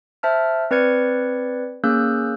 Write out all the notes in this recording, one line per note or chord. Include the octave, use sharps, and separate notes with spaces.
C5 E5 A5 F6
C4 B4 D5 G#6 C#7
A#3 C#4 G#4 E6 F#6 G6